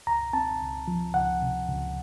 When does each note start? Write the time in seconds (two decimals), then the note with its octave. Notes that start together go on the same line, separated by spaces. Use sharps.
0.07 C#2 A#5
0.33 C4 A5
0.61 C#2
0.88 F3
1.14 C#2 F#5
1.42 C3
1.69 C#2